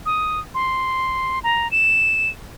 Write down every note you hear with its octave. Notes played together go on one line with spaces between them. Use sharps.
D#6
C6
A#5
E7